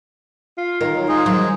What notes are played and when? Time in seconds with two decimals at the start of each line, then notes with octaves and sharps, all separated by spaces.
0.58 F4
0.81 D#3 A#4
0.96 F#3
1.08 G#3 D#4 G#4
1.26 F3 F#3